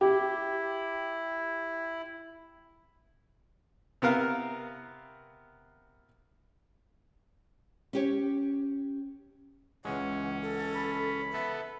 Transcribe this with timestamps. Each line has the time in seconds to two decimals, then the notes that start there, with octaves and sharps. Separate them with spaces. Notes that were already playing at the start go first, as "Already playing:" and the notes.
0.01 E4 G4
4.02 C3 B3 A#4 F5
7.93 C#4 G4 C#5
9.85 C#2 E3 G#3 C#4 F#5
10.42 A4
10.75 B5
11.33 B3 A4 E5